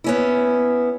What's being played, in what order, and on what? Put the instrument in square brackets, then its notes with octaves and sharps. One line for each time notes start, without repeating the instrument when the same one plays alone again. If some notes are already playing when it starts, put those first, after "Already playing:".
[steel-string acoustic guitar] B3 C#4 E4